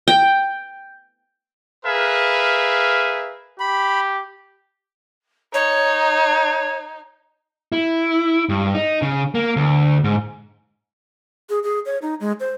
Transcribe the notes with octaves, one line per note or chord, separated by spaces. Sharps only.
G5
G#4 A#4 B4 E5 F5
G4 B5
D#4 C#5
E4
G2
D#4
C#3
A#3
D2
G#2
G#4
G#4
C#5
D#4
G#3
C5